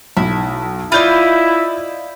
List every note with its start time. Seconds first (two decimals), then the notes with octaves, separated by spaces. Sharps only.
0.17 B1 E4
0.92 E4 F4 D5 D#5 B5 G6